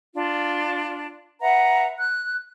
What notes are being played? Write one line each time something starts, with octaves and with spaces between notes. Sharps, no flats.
D4 F4
B4 E5 F#5 A#5
F#6